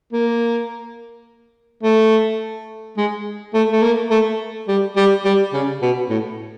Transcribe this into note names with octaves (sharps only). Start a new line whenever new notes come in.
A#3
A3
G#3
A3
A3
A#3
A3
G3
G3
G3
C#3
B2
A2